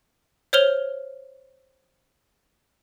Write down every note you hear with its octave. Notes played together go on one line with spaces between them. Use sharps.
C5 C#5 F6 F7 G7